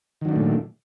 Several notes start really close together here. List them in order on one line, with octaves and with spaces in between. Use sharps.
D#3 F#3 D4 A3 A#2